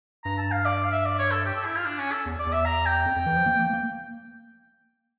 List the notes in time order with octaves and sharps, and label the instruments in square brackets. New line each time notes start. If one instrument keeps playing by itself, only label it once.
[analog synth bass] G2 [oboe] A#5
[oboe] A5
F5
D5
F5
E5
D5
C#5
A4
G4
A4
E4
F4
D4
C#4
A4
[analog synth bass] E2
[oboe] D5
[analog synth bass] E2
[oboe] E5
A#5
G5
[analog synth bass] F2
F2
E3
F3
A#3
A#3
A#3